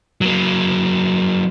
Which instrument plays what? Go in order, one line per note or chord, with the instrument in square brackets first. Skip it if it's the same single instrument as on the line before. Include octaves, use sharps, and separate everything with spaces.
[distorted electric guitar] F#3 A#3